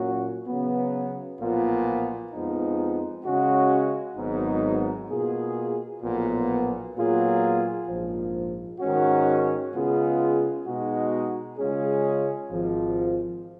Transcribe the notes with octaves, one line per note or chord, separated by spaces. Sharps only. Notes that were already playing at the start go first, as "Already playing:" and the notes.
Already playing: A#2 F#3 C#4 F#4
C#3 F#3 B3
B1 A#2 F3 B3 F4
F2 F3 G#3 B3 D#4
C#3 G#3 C#4 F#4
G#1 G#2 F#3 B3 D#4
B2 A#3 F4 G#4
B1 A#2 F3 B3
A#2 F#3 B3 F4 G#4
A#1 G#2 F3
G#2 D#3 G#3 C#4 F#4
C#3 G#3 B3 F4 G#4
B2 G#3 D#4 F#4
C#3 G#3 C#4 F4 G#4
G#1 G#2 F3